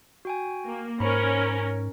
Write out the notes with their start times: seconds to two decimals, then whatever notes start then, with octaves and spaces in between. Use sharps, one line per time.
0.25 F#4 G5 G#5
0.66 A#3
1.00 G#2 C#4 A#4 C5 A#5 B5